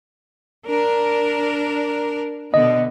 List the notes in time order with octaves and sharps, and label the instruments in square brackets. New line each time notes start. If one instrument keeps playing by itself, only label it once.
[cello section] D4 A#4
[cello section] B2 D3 B3 [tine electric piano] D#5